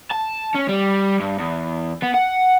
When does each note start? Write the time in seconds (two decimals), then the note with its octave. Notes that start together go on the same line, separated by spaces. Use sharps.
0.11 A5
0.55 C#4
0.69 G3
1.20 G2
1.40 E2
2.02 B3
2.14 F#5